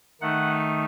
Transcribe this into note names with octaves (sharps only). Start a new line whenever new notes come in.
D#3 A3 D#4 F#5